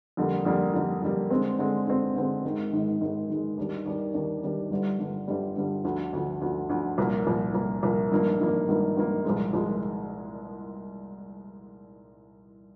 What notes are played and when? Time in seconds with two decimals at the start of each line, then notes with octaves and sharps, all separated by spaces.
0.17 F2 D3 G3 A#3
0.45 F2 D3 G3 A#3
0.74 F2 D3 G3 A#3
1.02 F2 D3 G3 A#3
1.30 D3 G#3 C4
1.59 D3 G#3 C4
1.87 D3 G#3 C4
2.16 D3 G#3 C4
2.44 G#1 G#2 D#3 G#3
2.73 G#1 G#2 D#3 G#3
3.01 G#1 G#2 D#3 G#3
3.29 G#1 G#2 D#3 G#3
3.58 D#2 D#3 G3 D4
3.86 D#2 D#3 G3 D4
4.14 D#2 D#3 G3 D4
4.43 D#2 D#3 G3 D4
4.71 G1 G2 D3 G3
4.99 G1 G2 D3 G3
5.28 G1 G2 D3 G3
5.56 G1 G2 D3 G3
5.84 D2 D3 F3
6.13 D2 D3 F3
6.41 D2 D3 F3
6.69 D2 D3 F3
6.98 C2 A#2 F3 A#3
7.26 C2 A#2 F3 A#3
7.54 C2 A#2 F3 A#3
7.83 C2 A#2 F3 A#3
8.11 G#1 G2 F3 A#3
8.40 G#1 G2 F3 A#3
8.68 G#1 G2 F3 A#3
8.96 G#1 G2 F3 A#3
9.25 C2 A#2 F3 G#3
9.53 C2 A#2 F3 G#3